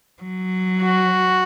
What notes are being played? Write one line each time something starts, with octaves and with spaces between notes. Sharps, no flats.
F#3
F#4